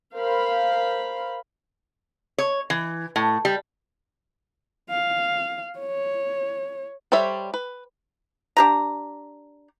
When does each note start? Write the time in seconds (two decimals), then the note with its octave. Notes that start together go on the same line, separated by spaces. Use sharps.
0.14 A#4 C5 F5 B5
2.38 C#5
2.70 E3
3.16 A2
3.45 G3
4.90 F5
5.79 C#5
7.12 G3 A4 C5 C#5 E5
7.54 B4
8.57 D4 G4 A#5